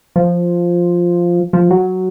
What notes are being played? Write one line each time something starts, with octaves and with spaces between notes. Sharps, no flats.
F3
F3
F#3